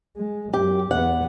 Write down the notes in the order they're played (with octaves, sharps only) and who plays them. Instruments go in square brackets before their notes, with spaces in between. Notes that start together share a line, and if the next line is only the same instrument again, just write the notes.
[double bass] G#3
[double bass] F#2 [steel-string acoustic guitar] G4
[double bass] E2 B3 [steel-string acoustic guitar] F#5